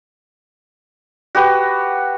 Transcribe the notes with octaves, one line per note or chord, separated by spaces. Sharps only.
F#4 G4 B4